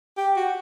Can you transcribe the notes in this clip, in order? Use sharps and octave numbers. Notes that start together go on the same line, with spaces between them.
G4
F#4